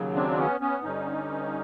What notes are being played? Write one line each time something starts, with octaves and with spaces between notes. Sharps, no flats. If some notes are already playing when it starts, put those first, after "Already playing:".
Already playing: D#2 C#3 F#3
C4 D4
B3 C#4
B3 C#4
G2 D3 G3 C#4 D#4